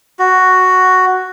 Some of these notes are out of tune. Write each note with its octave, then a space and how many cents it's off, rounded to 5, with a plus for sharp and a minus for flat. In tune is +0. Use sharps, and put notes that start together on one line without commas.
F#4 +5